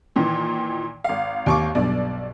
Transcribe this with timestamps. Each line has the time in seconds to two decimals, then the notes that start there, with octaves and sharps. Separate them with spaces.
0.16 A#2 D#3 E3
1.04 G#1 F5
1.46 D#2 C#6 D6
1.75 B1 G2 D5